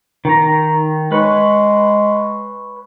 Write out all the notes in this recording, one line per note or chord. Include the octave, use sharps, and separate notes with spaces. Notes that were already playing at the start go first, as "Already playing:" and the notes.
D#3 A#5
G#3 B4 C#5